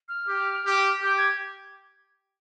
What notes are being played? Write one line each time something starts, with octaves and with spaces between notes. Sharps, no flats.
F6
G4
G4
G4 G6
G#6